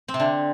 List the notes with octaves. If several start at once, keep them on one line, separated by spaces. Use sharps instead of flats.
C4
C3
D3